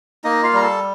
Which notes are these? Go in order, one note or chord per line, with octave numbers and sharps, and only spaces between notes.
A#3 D#4 D#5
F4 F5
G3 A#5
A4 A5